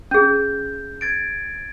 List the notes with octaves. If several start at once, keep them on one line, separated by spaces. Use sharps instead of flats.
C#4 G#4 G6
G#6 A6 D7